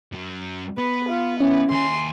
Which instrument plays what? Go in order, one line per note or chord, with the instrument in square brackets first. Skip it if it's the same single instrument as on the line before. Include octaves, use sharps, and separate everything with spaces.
[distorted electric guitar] F#2 F#3
[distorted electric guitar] B3 [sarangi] B4
[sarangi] F4
[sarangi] E3 [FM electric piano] C#4
[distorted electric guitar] D#2 G#5 [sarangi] C6